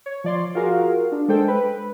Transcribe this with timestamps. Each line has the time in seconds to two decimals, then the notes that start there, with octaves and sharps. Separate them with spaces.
0.06 C#5
0.24 F3 D5 C6
0.55 F4 F#4 G#4 A#4 F5
1.12 D4
1.28 G#3 D4 A4 C5 G5
1.48 B4